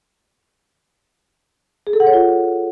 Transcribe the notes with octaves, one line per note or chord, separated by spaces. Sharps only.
G#4
A4
F#5
C#5
F4